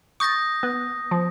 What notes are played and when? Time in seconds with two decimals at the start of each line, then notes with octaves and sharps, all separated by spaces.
0.20 C#6 D#6 G6 A6 A#6
0.63 B3
1.11 F3